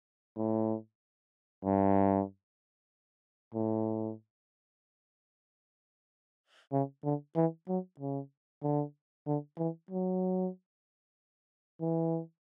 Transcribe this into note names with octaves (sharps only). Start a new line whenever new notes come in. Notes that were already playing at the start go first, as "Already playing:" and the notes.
A2
G2
A2
C#3
D3
E3
F#3
C#3
D3
D3
E3
F#3
E3